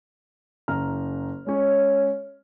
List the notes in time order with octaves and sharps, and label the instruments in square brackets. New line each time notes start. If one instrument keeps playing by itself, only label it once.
[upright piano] F#1 A#5 F6
[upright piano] G#3 C#4 [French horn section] C#5